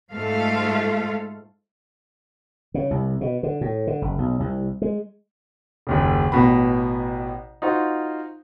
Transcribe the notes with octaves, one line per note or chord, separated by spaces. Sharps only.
G#2 G#3 A3 F4 A4 F5
C#3
C2
B2
D3
A2
D3
F#1
B1
C2
G#3
F#1 D#2 C#3
A1 B2 B5
D#4 F4 F#4 C5